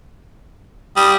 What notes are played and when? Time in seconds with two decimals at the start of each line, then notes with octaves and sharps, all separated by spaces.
0.96 G3 D#6